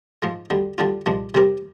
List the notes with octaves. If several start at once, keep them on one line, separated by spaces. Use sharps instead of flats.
G#2 F3 G#3
D2 D3 G3
D2 D3 G3 D4 F4
C2 A#2 F3 G#3 D4
C3 G3 C4 G4 A#4